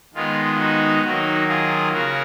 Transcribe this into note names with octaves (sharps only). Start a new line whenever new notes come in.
D#3 G#3 B3 F4
D#4 F#4
D#3 F#3 A#3 D#4 F#4
F4 G#4
C#3 F#4 A#4